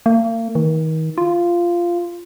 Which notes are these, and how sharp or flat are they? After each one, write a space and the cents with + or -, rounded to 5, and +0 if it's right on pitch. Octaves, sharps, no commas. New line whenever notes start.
A#3 -40
D#3 +35
F4 -10